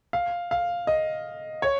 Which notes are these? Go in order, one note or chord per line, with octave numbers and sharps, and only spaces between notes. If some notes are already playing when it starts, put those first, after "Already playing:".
F5
F5
D#5
C#5